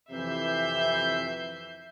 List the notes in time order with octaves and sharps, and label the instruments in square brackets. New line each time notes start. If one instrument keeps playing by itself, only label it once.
[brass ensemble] F2 C3 E3 [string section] E5 G6 C7